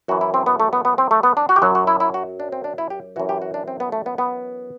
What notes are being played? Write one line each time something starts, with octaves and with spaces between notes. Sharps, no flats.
F#2 E3 F#4
E4
C4
B3
A3
B3
B3
C4
A3
B3
D4
F#4
G4
F#2 F#3 F#4
F#4
E4
E4
F#4
D4
C4
D4
E4
G4
F#2 E3 F#4
G4
F#4
D4
C4
B3
A3
B3
B3